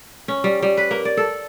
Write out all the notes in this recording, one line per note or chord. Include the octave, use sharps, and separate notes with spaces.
C#4
G3
G3
B4
A#3
D5
A4